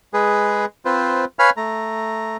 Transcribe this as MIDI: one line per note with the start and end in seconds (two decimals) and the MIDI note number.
0.14 0.65 56
0.14 0.65 68
0.14 0.65 71
0.85 1.25 60
0.85 1.25 65
0.85 1.25 71
0.85 1.25 72
1.39 1.50 71
1.39 1.50 73
1.39 1.50 77
1.39 1.50 80
1.39 1.50 83
1.39 1.50 89
1.57 2.37 57
1.57 2.37 82